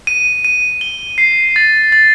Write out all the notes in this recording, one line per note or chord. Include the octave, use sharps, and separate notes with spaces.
D#7
D#7
G7
C7
A6
A6